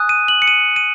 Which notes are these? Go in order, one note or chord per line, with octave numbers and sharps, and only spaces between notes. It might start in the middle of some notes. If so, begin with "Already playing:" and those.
Already playing: G#5 D#6 F#6
D#7
F#7
C#7
D#7
D#7